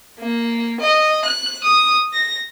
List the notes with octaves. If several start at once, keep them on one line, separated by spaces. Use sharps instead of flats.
A#3
D#5
F#6
D#6
A#6